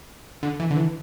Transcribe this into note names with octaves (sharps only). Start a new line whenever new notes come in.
D3
E3
D3
E3